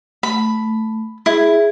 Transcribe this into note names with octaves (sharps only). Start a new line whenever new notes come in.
A3 B5
E4 G#4